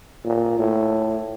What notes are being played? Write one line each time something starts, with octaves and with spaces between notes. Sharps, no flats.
A#2
A2